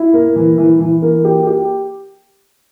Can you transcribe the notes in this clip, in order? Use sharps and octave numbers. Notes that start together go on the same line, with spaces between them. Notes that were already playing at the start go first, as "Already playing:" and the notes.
Already playing: E4
A#3
E3
E3
E3
A#3
G4
G4